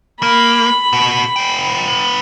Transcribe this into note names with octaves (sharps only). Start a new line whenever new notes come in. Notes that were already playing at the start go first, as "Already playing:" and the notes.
A#3 B5
B2 F#4
B3 G5